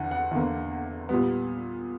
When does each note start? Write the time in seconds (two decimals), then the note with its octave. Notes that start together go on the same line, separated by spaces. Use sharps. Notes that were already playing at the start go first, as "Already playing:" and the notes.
Already playing: E2 D3 F#5
0.11 F#5
0.31 E2 D3 A#3
1.09 A#2 G3 B3